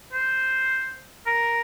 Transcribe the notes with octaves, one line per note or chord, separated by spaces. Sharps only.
C5
A#4